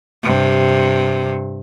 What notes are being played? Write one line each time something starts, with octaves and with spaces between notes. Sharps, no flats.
G2 C3